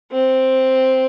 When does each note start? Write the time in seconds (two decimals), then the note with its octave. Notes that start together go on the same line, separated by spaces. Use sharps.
0.12 C4